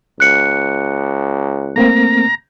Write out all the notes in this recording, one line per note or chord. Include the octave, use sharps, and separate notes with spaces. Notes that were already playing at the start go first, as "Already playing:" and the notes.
C#2 F#6 C#7
A3 A#3 C4 A#5